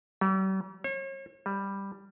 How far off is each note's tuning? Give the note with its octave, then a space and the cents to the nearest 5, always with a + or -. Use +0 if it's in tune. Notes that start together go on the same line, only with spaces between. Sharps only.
G3 -45
C#5 -40
G3 +5